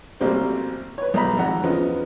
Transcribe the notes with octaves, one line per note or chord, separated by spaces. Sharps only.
A1 C3 F#3 G3 A#3 C5
B4 C#5
B1 D#4 A#5 B5
G#1 F2 F#5 A#5
E2 C#3 F3 B3 D#5